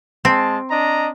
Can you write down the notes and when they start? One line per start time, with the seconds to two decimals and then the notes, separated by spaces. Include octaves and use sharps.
0.25 G#3 C4 A5
0.70 D4 D#5 A#5